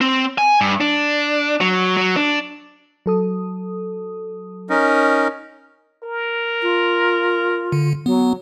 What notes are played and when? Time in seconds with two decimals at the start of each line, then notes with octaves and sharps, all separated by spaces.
0.01 C4
0.38 G#5
0.61 G2
0.81 D4
1.61 F#3
1.97 F#3
2.16 D4
3.06 F#3 A4 D#6
4.70 C#4 D#4 A#4
6.03 A#4
6.63 F4
7.72 D3
8.06 F#3 B3